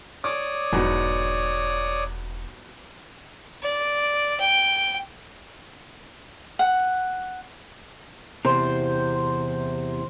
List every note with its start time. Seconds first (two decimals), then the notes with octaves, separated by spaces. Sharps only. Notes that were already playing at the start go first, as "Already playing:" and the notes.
0.24 C#5 D5 D6 D#6
0.73 E1 E2 G#2 F#3
3.63 D5
4.40 G5
6.59 F#5
8.45 E2 C3 C5